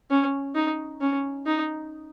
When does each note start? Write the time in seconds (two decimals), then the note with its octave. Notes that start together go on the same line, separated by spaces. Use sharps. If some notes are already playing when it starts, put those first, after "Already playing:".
0.10 C#4
0.55 D#4
1.01 C#4
1.46 D#4